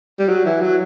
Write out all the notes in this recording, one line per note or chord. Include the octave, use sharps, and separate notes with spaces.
G3
F#3
E3
F#3